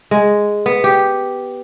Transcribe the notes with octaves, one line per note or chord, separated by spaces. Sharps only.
G#3
B3
G4